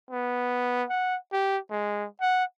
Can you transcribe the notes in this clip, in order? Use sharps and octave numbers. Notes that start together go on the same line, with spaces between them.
B3
F#5
G4
G#3
F#5